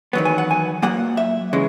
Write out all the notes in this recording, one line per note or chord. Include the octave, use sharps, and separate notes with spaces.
E2 D#3 F#3 B3
G#5
F#5
G#5
A#2 F#3 A#3 F#5
E5
C#3 E3 G#3